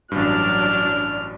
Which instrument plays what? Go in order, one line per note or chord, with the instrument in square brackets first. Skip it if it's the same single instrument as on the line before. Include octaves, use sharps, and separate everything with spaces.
[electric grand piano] A1 G2 [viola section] F#3 D4 [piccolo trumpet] F6